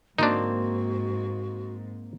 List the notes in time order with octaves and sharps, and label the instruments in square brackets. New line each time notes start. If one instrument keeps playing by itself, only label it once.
[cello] G#2 [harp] A#3 C4 [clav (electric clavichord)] D4 D#4 [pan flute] F#4